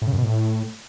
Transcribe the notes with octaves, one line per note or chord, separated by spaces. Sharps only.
A2
C#3
F#2
B2
A2